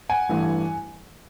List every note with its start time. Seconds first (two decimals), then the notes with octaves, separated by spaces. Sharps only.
0.09 F#5 G#5
0.29 A1 G2 E3 A3